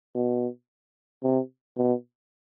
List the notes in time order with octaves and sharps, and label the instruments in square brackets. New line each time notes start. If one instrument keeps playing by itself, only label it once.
[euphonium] B2
C3
B2